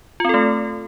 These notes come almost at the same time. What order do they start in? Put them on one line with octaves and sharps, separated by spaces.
F4 C4 A4 A3